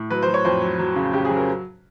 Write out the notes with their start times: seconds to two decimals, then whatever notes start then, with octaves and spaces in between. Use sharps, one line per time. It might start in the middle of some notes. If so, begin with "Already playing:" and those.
Already playing: A2
0.10 F#3 B4
0.22 C5
0.28 F#3
0.34 C#5
0.45 F2 C5
0.62 F#3
0.79 F#3
0.96 C#3
1.13 C#3 G4
1.25 G#4
1.30 F#3
1.36 A#4